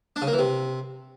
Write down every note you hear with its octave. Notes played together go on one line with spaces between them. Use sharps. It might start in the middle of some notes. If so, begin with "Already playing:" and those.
D4
C#3
A#3
E3
C3